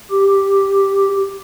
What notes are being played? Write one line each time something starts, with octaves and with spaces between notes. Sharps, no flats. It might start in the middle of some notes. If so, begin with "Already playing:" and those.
G4